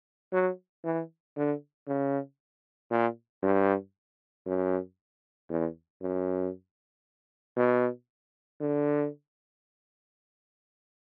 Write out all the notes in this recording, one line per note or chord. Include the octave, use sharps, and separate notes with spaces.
F#3
E3
D3
C#3
A#2
G2
F#2
E2
F#2
B2
D3